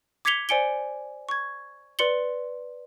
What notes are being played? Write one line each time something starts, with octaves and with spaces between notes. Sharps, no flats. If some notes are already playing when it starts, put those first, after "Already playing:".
D6 G#6 B6 C#7 F7 G7
C5 D5 G#5 C#7 D7 G7
C#6 G#6
B4 D5 C6 C#7 F#7 G7